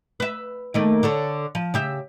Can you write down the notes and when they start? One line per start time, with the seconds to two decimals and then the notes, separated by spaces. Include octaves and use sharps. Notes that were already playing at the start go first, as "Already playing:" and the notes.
0.20 B4 E5
0.74 D#3 A3 A#3
1.03 D3 A4 C#5
1.55 F3
1.74 C#3 G4 E5